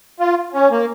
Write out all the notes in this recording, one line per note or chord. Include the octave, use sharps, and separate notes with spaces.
F4
C#4
A#3